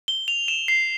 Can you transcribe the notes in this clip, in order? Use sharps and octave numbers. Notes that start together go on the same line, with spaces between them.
G7
F7
E7
C7